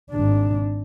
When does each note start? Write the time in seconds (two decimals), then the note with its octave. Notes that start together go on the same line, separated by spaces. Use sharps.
0.11 G#1 D4